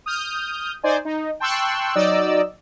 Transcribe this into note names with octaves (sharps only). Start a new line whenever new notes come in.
D#6 F6 G6
D#4 C5 D5 G#5
D#4
G5 A5 C6 C#6 E6 F#6
F#3 D#4 D5 D#5 E6